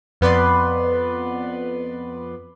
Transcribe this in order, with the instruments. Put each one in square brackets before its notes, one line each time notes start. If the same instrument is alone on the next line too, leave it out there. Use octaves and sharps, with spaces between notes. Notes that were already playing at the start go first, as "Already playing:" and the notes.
[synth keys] F2 B3 B4 D5 C6